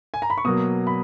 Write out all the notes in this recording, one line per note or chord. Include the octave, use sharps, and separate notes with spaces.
G#5
A#5
B5
C#6
B2 F#3 A#3 D#6
B5